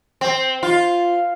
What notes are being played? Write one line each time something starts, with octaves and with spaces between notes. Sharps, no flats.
C4
F4